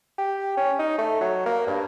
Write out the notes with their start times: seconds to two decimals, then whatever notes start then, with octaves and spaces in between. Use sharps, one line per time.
0.18 G4
0.57 C#4
0.79 D#4
0.98 A3
1.21 F#3
1.46 A#3
1.67 G2